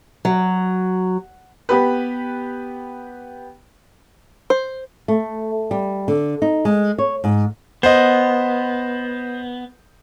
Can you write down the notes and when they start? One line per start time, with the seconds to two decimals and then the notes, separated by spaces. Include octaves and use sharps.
0.25 F#3
1.69 B3 G4 B4
4.50 C5
5.08 A3
5.71 G3
6.08 D3
6.42 D#4
6.65 G#3
6.98 C#5
7.24 G#2
7.83 B3 C5 D#5